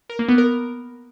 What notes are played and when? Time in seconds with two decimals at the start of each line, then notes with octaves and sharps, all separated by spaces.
0.10 A#4
0.19 A#3
0.29 B3
0.38 A#4